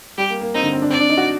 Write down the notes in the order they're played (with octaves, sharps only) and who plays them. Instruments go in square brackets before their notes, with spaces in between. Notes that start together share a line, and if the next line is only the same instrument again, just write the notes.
[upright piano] G3 [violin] G4
[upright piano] A#3
A#3
[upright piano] C4 [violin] D#4
[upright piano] D3
C4
D4
[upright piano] C4 [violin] D5
[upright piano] D4
D#4
F#4